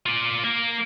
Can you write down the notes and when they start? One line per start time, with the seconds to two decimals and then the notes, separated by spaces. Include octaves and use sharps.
0.06 F4 D5
0.44 A#3